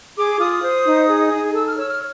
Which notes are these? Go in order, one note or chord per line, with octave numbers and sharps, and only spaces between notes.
G#4 D6
F4 D#6
C5
D#4
G#4
D#4
A4 E6
F6
C#5 E6
F6